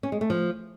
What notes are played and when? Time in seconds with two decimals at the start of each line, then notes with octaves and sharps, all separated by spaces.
0.03 C#4
0.12 G#3
0.21 A3
0.30 F3